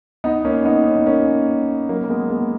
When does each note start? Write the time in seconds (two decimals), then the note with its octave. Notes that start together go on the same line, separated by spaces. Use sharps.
0.24 B3 D#4
0.45 A#3 C#4
0.65 B3 D#4
0.86 C#4
0.96 B3
1.06 A#3 C#4
1.89 F#3 A#3
2.04 A#3
2.09 G#3 B3
2.30 G#3 B3